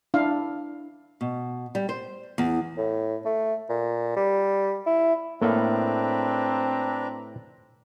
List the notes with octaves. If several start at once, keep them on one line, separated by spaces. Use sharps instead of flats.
D4 E4 F5
B2
G3
C5
E2
A2
A3
A#2
G3
E4
A2 A#3 C4 D4 A4 B4 F5 A#5